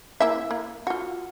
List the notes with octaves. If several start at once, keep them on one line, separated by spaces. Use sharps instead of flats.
A#3 E4 E5
A#3
F4 F#4